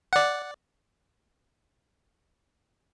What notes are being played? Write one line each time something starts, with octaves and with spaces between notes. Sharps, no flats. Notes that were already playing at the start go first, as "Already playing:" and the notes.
D5 F#5